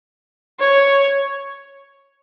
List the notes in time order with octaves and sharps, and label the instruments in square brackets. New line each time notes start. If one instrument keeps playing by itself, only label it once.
[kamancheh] C#5